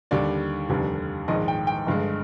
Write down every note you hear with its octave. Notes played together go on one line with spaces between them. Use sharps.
D#2 D3 G3 D5
F1 D#2 D3 G3
A#1 G#2 D#3 G#3 D#5
G5
G5
G1 G2 D3 G#3